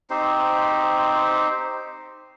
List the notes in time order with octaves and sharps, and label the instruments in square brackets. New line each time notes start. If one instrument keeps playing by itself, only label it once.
[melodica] C4 D#4 G4 C5